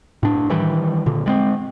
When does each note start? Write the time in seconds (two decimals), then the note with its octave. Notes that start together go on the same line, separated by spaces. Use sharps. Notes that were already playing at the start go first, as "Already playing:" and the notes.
0.23 A2 D4
0.50 D#3 E3 G3
1.06 A#2 D3
1.26 G3 G#3 C4